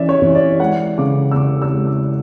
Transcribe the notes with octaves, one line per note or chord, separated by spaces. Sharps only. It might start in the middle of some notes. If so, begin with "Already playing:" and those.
Already playing: E3 C#4 D5 E5
C#5
E3
D5
G#3 F#5
C#3 D6
E6
C#3 D6
E6
G#3
D6